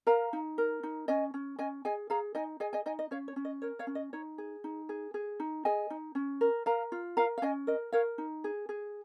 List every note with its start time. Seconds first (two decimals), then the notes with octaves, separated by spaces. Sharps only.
0.07 A#4 F5 A#5
0.33 D#4
0.58 A#4
0.83 D#4
1.08 C#4 D#5 G#5
1.34 C#4
1.59 C#4 D#5 G#5
1.85 G#4 D#5 G#5
2.10 G#4 F5 A#5
2.35 D#4 D#5 G#5
2.60 G#4 D#5 G#5
2.73 D#5 G#5
2.86 D#4 D#5 G#5
2.99 D#5
3.11 C#4 C#5 F5
3.28 C#5
3.36 C#4
3.45 D#5
3.62 A#4 C#5
3.79 C#5 F5
3.87 C#4
3.95 D#5
4.13 D#4 C#5
4.38 G#4
4.64 D#4
4.89 G#4
5.14 G#4
5.40 D#4
5.65 G#4 D#5 G#5
5.90 D#4
6.15 C#4
6.41 A#4
6.66 A#4 F5 A#5
6.92 F4
7.17 A#4 F5 A#5
7.38 F5
7.42 C#4 D#5 G#5
7.67 A#4 D#5
7.92 A#4 C#5 F5
8.18 D#4
8.44 G#4
8.69 G#4